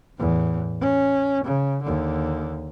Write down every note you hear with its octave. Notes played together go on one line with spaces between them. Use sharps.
E2 A2
C#4
C#3
D#2 D3